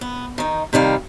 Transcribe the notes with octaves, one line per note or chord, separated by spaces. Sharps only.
B3
D#3 D#4
C3 D#3 G3 F5